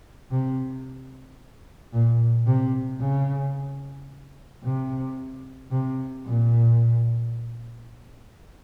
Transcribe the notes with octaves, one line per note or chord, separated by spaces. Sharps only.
C3
A#2
C3
C#3
C3
C3
A#2